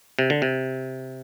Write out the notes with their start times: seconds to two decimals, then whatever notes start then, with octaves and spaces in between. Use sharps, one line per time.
0.19 C3
0.30 D3
0.42 C3